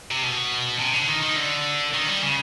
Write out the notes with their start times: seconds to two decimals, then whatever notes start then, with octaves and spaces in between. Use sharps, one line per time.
0.11 C3
0.23 B2
0.80 C3
0.94 D3
1.07 D#3
1.23 D#3
1.36 D3
1.93 D#3
2.08 G3
2.22 C#3